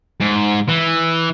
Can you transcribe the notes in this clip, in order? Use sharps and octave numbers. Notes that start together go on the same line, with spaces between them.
G#2
E3